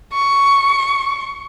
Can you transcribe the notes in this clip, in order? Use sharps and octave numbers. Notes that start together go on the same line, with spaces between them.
C#6